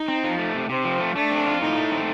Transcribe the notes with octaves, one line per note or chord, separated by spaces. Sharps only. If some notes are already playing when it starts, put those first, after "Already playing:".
Already playing: D#4
C4
F3
A3
C3
C3 C4
F3
A3
A3 D4
C4
F4
A2 D#4
A3
C4